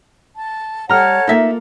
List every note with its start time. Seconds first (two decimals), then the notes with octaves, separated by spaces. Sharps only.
0.35 A5
0.89 G3 G4 A4 C#5 F#5 A5 A#5 F6
1.27 A#3 D#4 F4 A4 E5